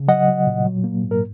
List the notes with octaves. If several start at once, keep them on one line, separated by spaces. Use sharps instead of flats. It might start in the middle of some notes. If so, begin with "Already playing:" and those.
Already playing: C#3
F#3 D#5 F#5
F#3
A#2
F#3
A#3
G#2
A#4